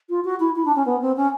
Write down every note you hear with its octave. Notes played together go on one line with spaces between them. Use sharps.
F4
F#4
E4
E4
D4
C#4
B3
C4
C#4